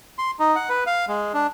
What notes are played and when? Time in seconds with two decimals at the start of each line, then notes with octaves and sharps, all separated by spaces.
0.18 C6
0.39 D#4
0.56 F#5
0.69 B4
0.87 F5
1.09 G#3
1.34 D4